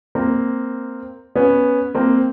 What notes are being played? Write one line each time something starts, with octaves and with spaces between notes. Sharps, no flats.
A#3 C4
B3 C#4
A#3 C4